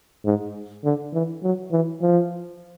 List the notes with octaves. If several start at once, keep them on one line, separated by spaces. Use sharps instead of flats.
G#2
D3
E3
F#3
E3
F3